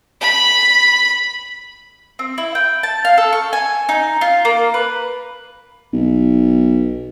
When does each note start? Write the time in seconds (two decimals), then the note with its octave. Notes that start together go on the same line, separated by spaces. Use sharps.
0.21 B5
2.19 C4
2.38 E4
2.55 G5
2.83 A5
3.05 F5
3.17 A4
3.33 C#6
3.53 G#5
3.89 D#4
4.21 F4
4.45 A#3
4.74 B4
5.93 B1